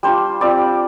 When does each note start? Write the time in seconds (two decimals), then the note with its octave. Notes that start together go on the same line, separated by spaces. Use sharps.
0.03 G3 D4 F4 C5
0.41 G3 C4 F4 D5